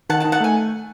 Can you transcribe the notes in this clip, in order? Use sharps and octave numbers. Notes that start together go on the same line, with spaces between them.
D#3 F#5 A5
F#5 A5
D#4
F#5 A5
A3 G#5